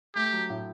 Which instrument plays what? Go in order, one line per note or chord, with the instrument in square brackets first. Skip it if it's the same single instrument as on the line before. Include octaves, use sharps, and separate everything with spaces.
[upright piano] A3 [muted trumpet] G4
[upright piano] F#3
A2